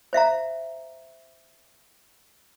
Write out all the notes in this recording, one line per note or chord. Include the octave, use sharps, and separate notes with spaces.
C5 E5 F5 A#5